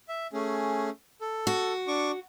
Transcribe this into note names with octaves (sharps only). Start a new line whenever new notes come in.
E5
A3 C#4 G#4
A4
F#4
D4 C#6 D6